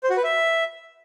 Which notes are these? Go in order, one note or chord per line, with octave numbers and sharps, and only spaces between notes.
C5
F#4
B4
E5